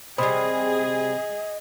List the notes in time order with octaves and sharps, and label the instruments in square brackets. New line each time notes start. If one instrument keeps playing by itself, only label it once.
[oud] C3 G3 [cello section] G#4 [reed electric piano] C5 B5 D#6 [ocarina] D#5